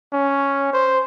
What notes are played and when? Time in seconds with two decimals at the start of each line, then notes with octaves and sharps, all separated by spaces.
0.13 C#4
0.73 C5